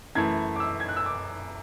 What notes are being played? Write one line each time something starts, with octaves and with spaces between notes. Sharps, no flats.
F#2 E3 A3 E4 G#6
D6
E6
G#6
F#6
E6
D6